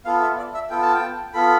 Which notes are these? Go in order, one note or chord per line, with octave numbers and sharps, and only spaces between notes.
B3 F4 A4 F5
E5
D5
E5
B3 F4 A4 G5
A5
G5
B3 F4 A4 B5